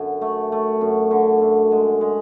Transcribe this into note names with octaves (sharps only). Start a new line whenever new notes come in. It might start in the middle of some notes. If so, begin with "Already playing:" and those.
Already playing: F#2 D3
A3
A3
F#2
D3
F#2
G#3
G#3